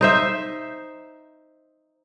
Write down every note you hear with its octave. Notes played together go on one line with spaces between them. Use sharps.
D#4 C5 E5